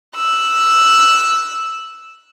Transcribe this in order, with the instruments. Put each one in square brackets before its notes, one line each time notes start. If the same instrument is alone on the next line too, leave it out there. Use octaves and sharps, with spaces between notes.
[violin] E6 F#6